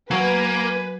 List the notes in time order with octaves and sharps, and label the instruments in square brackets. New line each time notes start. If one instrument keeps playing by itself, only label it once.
[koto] F#3 [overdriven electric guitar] A#3 [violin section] B4 [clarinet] G#5